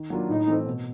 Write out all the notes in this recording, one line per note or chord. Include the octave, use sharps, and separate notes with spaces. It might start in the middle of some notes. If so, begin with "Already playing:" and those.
Already playing: D#3
F#3 A#3 D4 F4
A2 D#4
E3 A3 C4
B2